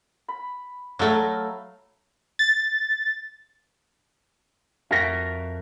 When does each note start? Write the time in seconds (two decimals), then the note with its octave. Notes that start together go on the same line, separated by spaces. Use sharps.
0.28 B5
0.99 F#3 A3 A4 F5 A#5
2.39 A6
4.91 F2 F#4 A#4 E5 F5 A#6